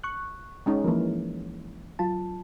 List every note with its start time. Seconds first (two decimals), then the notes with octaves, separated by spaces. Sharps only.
0.04 C#6 F#6
0.66 G#3 C#4 D#4
0.84 E3 F3 A#3 A#4
1.99 F#3 F4 A5